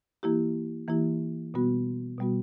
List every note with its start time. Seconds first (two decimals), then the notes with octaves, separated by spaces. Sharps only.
0.23 E3 A#3 E4 G4
0.88 E3 A#3 E4 G4
1.54 B2 G3 B3 F#4
2.18 B2 G3 B3 F#4